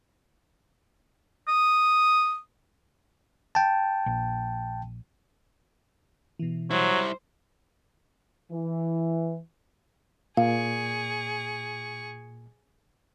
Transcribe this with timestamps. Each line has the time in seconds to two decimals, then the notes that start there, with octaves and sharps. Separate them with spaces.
1.48 D#6
3.55 G5 A5
4.06 A#1
6.39 B2 E3
6.71 F#3 G3 E4 C5
8.52 E3
10.37 A#2 G#4 F5 C#6